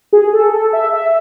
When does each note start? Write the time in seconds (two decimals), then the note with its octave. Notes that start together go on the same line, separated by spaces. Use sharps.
0.13 G#4
0.33 A4
0.53 A4
0.73 E5
0.93 E5